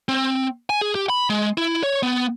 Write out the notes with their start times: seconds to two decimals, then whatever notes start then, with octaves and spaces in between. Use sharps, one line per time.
0.08 C4
0.70 G#5
0.81 G#4
0.95 G4
1.10 B5
1.30 G#3
1.58 E4
1.83 C#5
2.03 B3